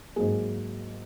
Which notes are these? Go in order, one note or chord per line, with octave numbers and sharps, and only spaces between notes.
G#2 F#3 A#3 G#4